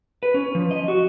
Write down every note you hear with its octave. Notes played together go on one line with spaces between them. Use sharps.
B4
C#4
F3
D#5
F#4